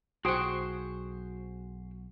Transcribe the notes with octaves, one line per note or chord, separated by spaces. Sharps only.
B1 F#4 G#4 C5 G5 C#6 D#6 F#6